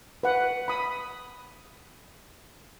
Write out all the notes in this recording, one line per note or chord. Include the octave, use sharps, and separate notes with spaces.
B4 F#5
B5 D#6